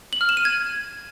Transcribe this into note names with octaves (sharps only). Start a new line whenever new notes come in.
F#7
F6
E7
D#7
G#6